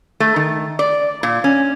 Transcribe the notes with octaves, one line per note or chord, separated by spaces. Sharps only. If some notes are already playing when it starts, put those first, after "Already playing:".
A3
D#3
D5
A#2
C#4